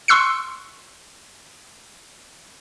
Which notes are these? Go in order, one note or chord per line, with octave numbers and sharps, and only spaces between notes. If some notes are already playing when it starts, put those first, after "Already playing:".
C6 C#6 E6 F#6 C7 C#7